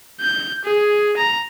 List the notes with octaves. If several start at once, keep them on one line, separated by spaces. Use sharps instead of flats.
G6
G#4
A#5